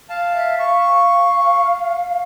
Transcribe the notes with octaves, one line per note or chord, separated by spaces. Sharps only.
F5 A5
E5
F5 C#6